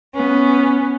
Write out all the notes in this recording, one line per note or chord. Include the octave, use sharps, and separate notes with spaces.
B3 C#4